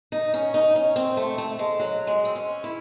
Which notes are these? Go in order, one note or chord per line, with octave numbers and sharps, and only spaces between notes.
D#4
C#4
D#4
C#4
C4
A3
A3
G#3
F#3
G#3
C4
C#4
E4